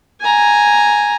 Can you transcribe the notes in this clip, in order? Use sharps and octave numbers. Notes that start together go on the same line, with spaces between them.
G#5 A#5